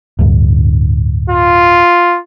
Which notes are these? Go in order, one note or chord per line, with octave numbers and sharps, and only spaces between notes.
D1 D2 G2
F4